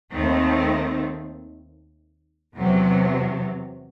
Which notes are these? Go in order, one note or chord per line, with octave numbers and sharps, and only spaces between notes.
D#2 D#3 A3 C4
E2 C3 F#3